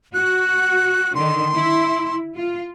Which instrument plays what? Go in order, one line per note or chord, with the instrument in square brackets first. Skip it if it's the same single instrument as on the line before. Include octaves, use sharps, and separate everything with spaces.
[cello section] F#4 [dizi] F#6
[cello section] D3 D#3 [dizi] C6
[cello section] E4
F4